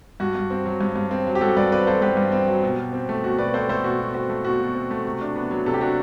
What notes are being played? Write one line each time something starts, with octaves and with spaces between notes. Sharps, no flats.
G2 F#4
G2
C4
F#3
G2
G2
C4
F#3
G4
G2 F#4 A4
G2 B4 D5
C4 B4 D5
F#3 A4 C5
G2 G4 B4
G2
C4
F#3
B2
B2
C4
A3
B2 F#4
B2 B4 D5
C4 A4 C5
A3 A4 C5
B2 F#4
B2
C4 F#4
A3
B2 F#4
B2
C4
A3
C3
D4
B3
F#3
C3 A4
G4
D4 F#4